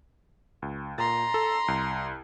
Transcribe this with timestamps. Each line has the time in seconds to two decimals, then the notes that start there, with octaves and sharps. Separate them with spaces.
0.62 C#2
0.98 A#2 A#5 C6 A6
1.34 A4
1.68 C2